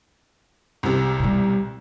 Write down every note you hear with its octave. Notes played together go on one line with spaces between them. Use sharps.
C2 C3
B2 G3